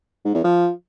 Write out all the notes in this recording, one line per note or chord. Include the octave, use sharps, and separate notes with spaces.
G#2
E2
F3